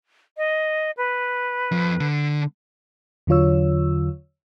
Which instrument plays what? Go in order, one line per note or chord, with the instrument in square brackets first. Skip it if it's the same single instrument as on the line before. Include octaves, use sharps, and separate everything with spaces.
[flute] D#5
B4
[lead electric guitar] F2
D3
[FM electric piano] E2 D3 F#3 F4 C#5 E6